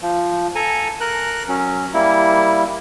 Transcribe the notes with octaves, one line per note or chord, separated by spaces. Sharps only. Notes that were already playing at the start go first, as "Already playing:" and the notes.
F3
A4 G#5 A#5
A#4 F#6
F#3 C#4
G3 A#3 E4